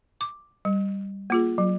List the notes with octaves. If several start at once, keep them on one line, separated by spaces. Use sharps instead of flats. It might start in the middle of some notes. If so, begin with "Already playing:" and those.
D6
G3
A#3 F4 G#4
F#3